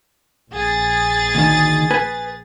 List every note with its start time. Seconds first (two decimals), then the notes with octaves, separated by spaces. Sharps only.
0.52 A#1 G#4 A6
1.35 D2 D#3
1.91 B4 G#5